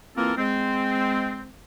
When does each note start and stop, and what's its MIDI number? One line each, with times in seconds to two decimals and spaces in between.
0.16 0.32 52
0.16 0.32 58
0.16 0.32 60
0.16 0.32 65
0.16 0.32 69
0.16 0.32 70
0.37 1.49 56
0.37 1.49 60